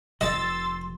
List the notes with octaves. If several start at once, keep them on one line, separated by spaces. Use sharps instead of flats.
F1 C3 D#5 C6 E6 A6